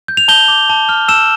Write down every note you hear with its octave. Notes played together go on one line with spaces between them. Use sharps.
G6
F7
A5 G6 G7
D6
A5
F6
A5 E6 E7